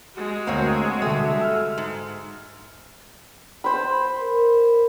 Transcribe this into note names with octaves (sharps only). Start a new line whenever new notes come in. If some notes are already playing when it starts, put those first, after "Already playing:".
G#3 F#4
D2 A#3 C4 C#5
D3 G3 A3
E6 F6
G#2
C5 B5
A#4